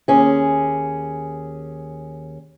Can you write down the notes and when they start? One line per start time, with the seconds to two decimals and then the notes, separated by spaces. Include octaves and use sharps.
0.08 D#2 C#4 G#4